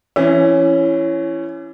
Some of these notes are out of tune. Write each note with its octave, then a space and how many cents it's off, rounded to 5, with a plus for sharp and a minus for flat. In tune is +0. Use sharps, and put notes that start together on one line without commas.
E3 +30 C#4 +0 E4 +0